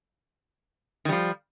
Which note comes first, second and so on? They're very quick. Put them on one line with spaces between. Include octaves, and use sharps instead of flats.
D#3 G3 F3